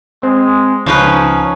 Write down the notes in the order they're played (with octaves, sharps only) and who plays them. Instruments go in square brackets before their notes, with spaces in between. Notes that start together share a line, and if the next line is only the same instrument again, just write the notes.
[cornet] G#3 [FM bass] C4
[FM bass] C#2 [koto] F3 D#4 B4 [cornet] C#4